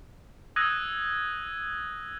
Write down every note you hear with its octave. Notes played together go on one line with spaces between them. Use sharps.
D#6 E6 F#6 G#6 A#6 D#7